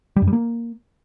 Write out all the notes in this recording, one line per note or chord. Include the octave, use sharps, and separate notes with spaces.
G3
F#2
G3
A#3